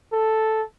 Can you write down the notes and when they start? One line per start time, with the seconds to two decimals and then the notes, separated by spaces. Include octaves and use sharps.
0.13 A4